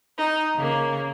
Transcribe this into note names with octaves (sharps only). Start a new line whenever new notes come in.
D#4
C#3 A#3